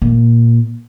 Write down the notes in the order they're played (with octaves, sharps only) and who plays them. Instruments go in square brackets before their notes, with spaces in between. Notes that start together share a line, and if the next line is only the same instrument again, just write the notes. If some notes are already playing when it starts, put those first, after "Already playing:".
[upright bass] A#2